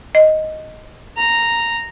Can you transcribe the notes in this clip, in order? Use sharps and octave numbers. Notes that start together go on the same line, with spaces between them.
D#5
A#5